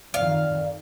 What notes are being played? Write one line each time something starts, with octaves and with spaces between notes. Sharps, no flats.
F2 D#3 D5 F5